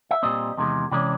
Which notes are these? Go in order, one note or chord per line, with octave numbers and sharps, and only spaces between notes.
E5
A#2 G3 C4 D#5
E2 C3 D#3 G#3
C3 E3 G#3 C#4 D5